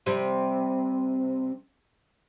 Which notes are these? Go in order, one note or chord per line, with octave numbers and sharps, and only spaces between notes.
C3 G3